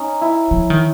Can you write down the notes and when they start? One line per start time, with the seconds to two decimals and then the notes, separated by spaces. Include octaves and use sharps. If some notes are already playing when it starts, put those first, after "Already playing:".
Already playing: C#4 D#4
0.21 E4
0.51 F3
0.70 D#3